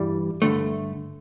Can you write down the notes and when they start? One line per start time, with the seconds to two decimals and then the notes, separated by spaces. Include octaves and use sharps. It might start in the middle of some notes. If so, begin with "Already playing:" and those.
Already playing: G2 E3 G3
0.42 G2 D3 A3